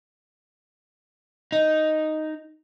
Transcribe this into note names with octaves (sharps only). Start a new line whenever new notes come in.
D#4